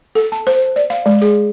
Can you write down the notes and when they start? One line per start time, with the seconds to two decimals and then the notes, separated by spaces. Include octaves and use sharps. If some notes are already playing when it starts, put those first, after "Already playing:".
0.15 A4
0.32 A5
0.47 C5
0.76 D5
0.90 F5
1.06 G#3
1.22 G#4